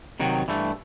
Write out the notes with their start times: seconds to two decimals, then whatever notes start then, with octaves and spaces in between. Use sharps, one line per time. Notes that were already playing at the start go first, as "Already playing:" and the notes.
0.20 C3 D#3 F#3
0.48 G2 E3 A3